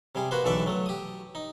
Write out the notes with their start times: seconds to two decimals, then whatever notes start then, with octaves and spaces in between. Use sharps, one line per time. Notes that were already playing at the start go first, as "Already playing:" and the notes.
0.15 C3 G3 G#4
0.31 A#3 F#4 B4 C5
0.44 B1 D3 E3 A4 D5 E5
0.66 F#3 A3
0.86 G4 D#6
1.35 D#4